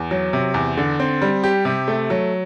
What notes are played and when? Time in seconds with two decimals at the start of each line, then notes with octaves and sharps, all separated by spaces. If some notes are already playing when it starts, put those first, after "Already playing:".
Already playing: E2
0.11 F#3
0.33 C3
0.54 E2
0.77 D3
0.99 C4
1.22 G3
1.43 G4
1.65 C3
1.88 A3
2.10 F#3